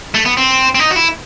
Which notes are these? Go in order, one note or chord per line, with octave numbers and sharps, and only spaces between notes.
A3
B3
C4
C4
D#4
F#4
E4